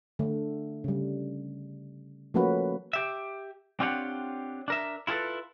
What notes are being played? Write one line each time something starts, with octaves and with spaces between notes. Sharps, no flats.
D3 A3
C#3 G3
F3 A3 A#3 C#4 F#4 B4
G4 E5
C4 D4 F4 G4 C#5 F#5
D4 A#4 E5
E4 F4 G#4 A4 B4